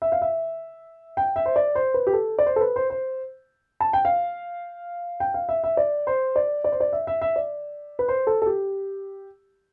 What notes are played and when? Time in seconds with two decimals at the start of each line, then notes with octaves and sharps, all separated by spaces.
0.02 E5
0.12 F5
0.22 E5
1.17 G5
1.36 E5
1.46 C5
1.56 D5
1.75 C5
1.94 B4
2.07 G4
2.13 A4
2.39 D5
2.46 C5
2.56 A4
2.61 B4
2.76 C5
2.90 C5
3.80 A5
3.93 G5
4.05 F5
5.20 G5
5.34 F5
5.49 E5
5.64 E5
5.77 D5
6.07 C5
6.36 D5
6.64 D5
6.72 C5
6.80 D5
6.93 E5
7.07 E5
7.21 E5
7.36 D5
7.99 B4
8.08 C5
8.27 A4
8.42 A4
8.46 G4